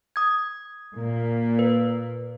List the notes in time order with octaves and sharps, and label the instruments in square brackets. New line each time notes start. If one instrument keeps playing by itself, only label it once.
[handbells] D#6 G#6
[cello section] A#2 A#3
[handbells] B4